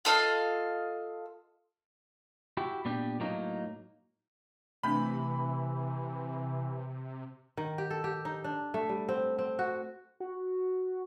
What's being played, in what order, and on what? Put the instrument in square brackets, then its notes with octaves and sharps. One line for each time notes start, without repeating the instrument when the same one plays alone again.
[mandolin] F4 A4 D#5 F5
[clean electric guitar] E4 F#4 G4
A#2 B3 D4 G4
A2 F#3 A#3 D#4
[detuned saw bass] C3 [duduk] E3 [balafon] A3 C4 D4 [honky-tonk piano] B5
[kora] D#3
G4
A4
G4
D#4
D4
A3
G3
C4
C4
F#4
[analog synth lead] F#4